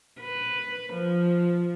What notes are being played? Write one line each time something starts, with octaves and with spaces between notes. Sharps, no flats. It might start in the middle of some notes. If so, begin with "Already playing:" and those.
B4
F3